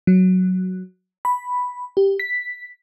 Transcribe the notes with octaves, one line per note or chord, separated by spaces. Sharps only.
F#3
B5
G4
B6